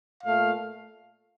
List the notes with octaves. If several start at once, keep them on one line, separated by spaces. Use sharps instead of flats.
A#2 A3 F5